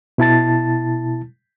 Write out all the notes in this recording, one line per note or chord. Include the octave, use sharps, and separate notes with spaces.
B2 E4 A5 A6